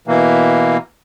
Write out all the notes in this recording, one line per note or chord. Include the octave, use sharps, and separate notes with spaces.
B2 E3 A#3